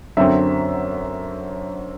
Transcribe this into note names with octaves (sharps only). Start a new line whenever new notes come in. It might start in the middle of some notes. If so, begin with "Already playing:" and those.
F#2 D3 F#3 C4 E5